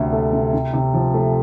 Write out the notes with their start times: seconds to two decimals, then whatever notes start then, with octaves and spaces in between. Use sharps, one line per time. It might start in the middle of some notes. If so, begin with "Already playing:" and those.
Already playing: D2 C3
0.13 A3
0.33 C3
0.53 C3
0.73 C3
0.94 F3
1.14 A3